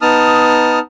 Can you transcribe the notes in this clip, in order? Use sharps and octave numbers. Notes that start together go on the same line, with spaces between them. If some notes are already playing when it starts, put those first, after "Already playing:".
B3 D#4 A5 D#6 F6